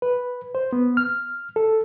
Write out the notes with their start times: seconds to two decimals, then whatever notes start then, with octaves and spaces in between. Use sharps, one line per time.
0.02 B4
0.55 C5
0.73 B3
0.97 F6
1.56 A4